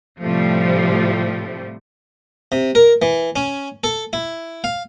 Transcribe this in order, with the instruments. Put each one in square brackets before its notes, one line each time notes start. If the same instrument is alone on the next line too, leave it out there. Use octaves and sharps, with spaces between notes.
[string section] A2 C3 F3 G3 A3
[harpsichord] C3
A#4
E3
C#4
A4
E4
F5